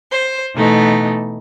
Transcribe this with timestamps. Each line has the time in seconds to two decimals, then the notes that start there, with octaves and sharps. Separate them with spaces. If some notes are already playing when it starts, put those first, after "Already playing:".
0.11 C5
0.54 B2 E3 A3 B3 D#4